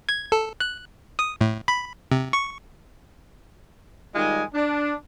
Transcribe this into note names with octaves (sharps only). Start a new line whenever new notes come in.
G#6
A4
F#6
D#6
A2
B5
C3
C#6
D#3 G3 G#3 F4 D#5 G#5
D4